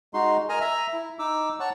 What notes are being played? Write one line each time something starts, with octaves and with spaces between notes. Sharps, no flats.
G#3 D#4 F#4 C6
A#4 D#5 G#5 A#5
E5 A#5
E4
D#4 D6 E6
C#5 F#5 A5 C#6